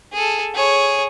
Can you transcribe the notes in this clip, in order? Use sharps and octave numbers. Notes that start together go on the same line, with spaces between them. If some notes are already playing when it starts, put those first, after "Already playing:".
G#4 A4
G#4 C#5